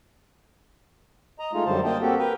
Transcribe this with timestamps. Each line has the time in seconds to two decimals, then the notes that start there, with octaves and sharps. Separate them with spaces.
1.39 D#5 A#5
1.53 G#3 A3 D#4 F4
1.66 F#2 D3 G3 C5 A5
1.84 A#3 D#5 G5 A5
2.01 A#3 C4 F#4 G4 A4
2.19 A#4 B4 G5